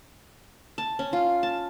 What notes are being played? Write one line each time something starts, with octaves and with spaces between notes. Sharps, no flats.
A5
C#4
F4
A5